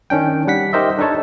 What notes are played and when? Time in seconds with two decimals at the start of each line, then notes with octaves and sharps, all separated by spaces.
0.10 D#3 C#4 D4 G5
0.47 G3 F#5 B6
0.73 D#4 G4 A#4 C5 D#5 E5
0.98 D4 D#4 A4 C#5 A5